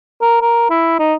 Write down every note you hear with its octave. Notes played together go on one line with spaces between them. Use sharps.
A#4
A#4
E4
D#4